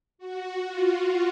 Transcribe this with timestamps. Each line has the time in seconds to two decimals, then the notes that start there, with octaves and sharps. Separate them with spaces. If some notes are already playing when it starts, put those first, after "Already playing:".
0.18 F#4
0.66 F4